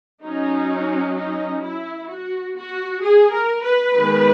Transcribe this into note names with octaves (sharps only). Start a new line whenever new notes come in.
F#3 C#4 D#4
D#4
E4
F#4
F#4
G#4
A#4
B4
D#3 G#3 B3